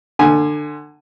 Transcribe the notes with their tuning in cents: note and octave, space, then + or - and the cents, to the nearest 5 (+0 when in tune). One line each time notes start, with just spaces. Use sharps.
D3 +25 G#5 +0